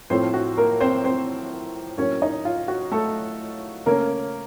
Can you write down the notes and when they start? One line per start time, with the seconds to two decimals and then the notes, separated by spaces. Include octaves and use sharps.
0.10 A2 F3 A3 C4 C5
0.34 F#4
0.58 A#3 A#4
0.81 C4 C5
1.04 C4 C5
1.98 A2 F#3 A#3 C#4 C#5
2.22 D#4 D#5
2.45 F4
2.68 F#4
2.92 A3 A4
3.86 C#3 A3 A#3 C#4 A#4